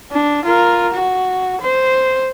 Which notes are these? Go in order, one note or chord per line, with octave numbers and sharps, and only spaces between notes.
D4
F4 A#4
F#4
C5